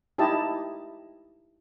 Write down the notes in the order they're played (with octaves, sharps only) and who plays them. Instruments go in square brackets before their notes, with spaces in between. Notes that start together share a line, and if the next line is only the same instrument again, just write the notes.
[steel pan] D#4 E4 G4 D#5 A5